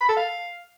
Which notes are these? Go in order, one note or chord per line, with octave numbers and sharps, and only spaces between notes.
B5
A4
F5